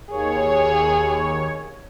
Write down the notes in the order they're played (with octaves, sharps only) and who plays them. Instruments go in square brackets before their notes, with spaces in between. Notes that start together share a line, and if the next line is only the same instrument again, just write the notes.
[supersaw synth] D#2 C#5 [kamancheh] G#4